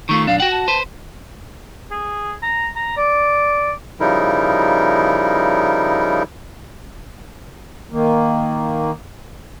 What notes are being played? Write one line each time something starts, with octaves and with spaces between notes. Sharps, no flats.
D#3 A3 F4 C#6
B1 F#2 D4 F5
F#4 F#5 G5
A5
B4 C5
G#4
A#5
A#5
D5
C#3 F3 G3 D#4 E4 A#4
D#3 A#3